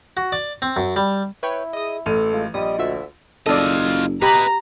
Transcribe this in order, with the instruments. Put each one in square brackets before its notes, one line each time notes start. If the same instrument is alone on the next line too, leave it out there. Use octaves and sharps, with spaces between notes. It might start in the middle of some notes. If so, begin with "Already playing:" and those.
[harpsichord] F#4
D5
C4
F#2
G3
[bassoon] E4 [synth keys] B4 C#5 G5
[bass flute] G#4 [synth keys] D#5 D#6
[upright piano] A1 A3 D#7 [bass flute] A4 [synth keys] F6
[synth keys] G#3 [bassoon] F4
[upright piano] A#1 [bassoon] G3 [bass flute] D#5 [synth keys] D#6
[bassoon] D2 [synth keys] F4 F#4 E5
[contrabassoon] F#1 [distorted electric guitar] F4 D#5 [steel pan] A4 D5
[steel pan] G4 B5 [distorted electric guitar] B4 D#5 [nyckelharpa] A#5